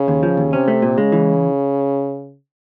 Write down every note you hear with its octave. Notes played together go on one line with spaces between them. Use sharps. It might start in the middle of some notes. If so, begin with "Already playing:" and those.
Already playing: C#3
D#2
F3
D#2
C3 C#4
A3
A#2
C#3 G#3
E3